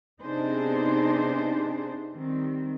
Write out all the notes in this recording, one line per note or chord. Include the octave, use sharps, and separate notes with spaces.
C3 B3 D4 D#4 G#4 C5
D#3 G3 C4